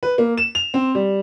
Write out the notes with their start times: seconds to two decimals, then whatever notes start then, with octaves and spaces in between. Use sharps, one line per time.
0.03 B4
0.18 A#3
0.38 E7
0.55 F7
0.74 C4
0.95 G3